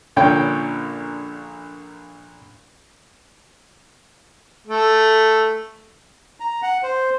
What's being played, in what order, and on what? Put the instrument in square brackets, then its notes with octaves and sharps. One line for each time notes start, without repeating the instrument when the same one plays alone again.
[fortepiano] A#1 A#2 D3 C#4 G5
[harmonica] A3
[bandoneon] A#5
F#5
C5